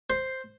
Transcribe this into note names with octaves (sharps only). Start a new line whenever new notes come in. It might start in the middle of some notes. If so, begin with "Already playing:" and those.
C5